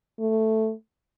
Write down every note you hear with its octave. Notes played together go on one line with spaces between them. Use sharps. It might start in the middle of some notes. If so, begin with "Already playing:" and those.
A3